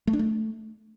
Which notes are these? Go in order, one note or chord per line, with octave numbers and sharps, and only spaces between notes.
A3
D4
A3